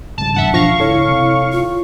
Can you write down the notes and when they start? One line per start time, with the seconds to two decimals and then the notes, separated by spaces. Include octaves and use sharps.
0.18 G#1 C#2 G3 A5
0.34 E2 G2 E5 F#5 A5
0.54 E2 B2 F3 D4 F5 C#6 A#6
0.80 G1 C#2 E4 A4 C#5
1.07 C3
1.52 F4